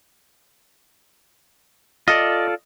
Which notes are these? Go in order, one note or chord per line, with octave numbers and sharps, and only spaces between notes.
F4 A4 D5 D#5